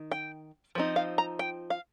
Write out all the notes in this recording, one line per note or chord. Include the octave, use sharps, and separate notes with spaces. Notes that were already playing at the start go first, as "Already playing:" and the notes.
Already playing: D#3
G5
F3 C4 D#4
F5
A#5
G5
F5